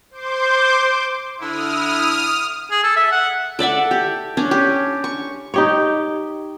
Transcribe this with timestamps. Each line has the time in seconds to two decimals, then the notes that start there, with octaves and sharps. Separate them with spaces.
0.11 C5 C6 D6 G6
1.40 D3 E4 D#6 F6
2.71 G#4
2.84 A4
2.96 E5
3.12 F#5
3.59 A4 D5 E5 F#5
3.91 G4
4.37 C#4 D4
4.51 G4
5.04 C#6
5.54 D#4 G4 C#5